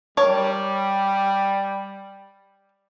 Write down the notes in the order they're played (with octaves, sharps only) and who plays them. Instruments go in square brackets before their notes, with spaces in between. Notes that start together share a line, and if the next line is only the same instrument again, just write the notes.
[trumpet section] G3 [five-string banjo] A#4 C#5 A5